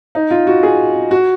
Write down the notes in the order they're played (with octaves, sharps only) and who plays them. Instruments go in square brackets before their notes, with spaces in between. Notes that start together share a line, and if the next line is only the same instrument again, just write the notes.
[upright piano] D#4
F4
F#4
G#4
F#4